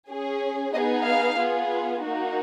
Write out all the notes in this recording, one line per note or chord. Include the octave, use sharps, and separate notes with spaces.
C#4 G#4
B3 D#4 G#4 D#5
F5
B3 F4 G#4
A#3 D#4 F#4